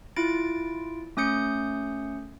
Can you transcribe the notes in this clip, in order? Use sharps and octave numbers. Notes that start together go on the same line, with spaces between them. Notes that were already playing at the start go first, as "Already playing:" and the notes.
E4 F4 A6 D7
A3 C#4 D#6 G6 C#7